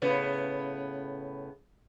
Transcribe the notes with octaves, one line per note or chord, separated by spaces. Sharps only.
A2 C#3 B3